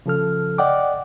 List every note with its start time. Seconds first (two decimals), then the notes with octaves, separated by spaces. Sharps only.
0.06 C#3 F3 A4 F6
0.58 D5 D#5 F#5 G5 D6